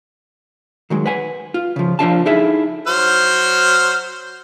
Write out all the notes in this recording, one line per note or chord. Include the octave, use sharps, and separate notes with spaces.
D#3 F#3 G#3
B4 F#5 G#5
F4
C#3 F3
F3 F#3 D4 F4 F5 A5
D#4 E4 G#4 A4 E5
F#3 C5 F6